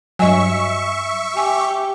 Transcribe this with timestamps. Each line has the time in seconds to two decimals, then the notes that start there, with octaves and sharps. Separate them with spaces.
0.19 G2 F#3 D#5 E5 G#5 C#6
1.37 G4 G#5